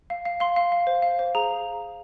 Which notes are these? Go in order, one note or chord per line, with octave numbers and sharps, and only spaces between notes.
F5
F5
F5 C6
F5
F5
C5
F5
C5
G#4 A#5